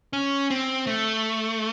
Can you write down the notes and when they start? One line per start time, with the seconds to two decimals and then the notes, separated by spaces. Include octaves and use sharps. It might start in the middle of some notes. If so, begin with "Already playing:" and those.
0.13 C#4
0.50 C4
0.87 A3